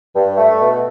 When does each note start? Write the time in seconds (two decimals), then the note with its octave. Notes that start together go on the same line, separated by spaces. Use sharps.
0.15 G2
0.37 A3
0.61 B2